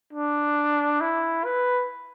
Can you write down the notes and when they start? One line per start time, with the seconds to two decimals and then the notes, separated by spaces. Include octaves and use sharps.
0.13 D4
1.01 E4
1.45 B4